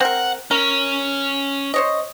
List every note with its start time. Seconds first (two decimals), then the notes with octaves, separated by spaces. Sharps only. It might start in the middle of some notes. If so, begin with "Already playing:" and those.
0.01 C4 A#4 F#5
0.51 C#4 A#4
1.74 C5 C#5 D#5